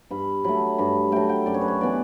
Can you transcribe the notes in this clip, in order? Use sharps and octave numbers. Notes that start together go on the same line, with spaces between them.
G2 B5
F#3 A3 B5
G2 B5
F#3 A3 G5
G5
F#2 D5
C#5
B4
C#5
E3 B3 D5